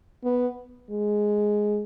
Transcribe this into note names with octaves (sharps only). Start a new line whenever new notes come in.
B3
G#3